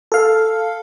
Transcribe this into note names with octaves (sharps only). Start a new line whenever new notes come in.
A4 F5